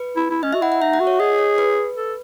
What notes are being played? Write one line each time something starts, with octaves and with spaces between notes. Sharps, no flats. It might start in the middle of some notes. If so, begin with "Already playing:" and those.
Already playing: B4
E4
E4
C#4 D#5
F#4 E5
E4 F#5
F#5
D#4 E5
F#5
F#4
C#5
G#4 D#5
C#5
B4
A4